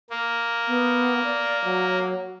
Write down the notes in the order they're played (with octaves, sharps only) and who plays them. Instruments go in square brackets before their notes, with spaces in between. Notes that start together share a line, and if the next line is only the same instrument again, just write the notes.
[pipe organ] A#3
[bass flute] B3
D5
F#3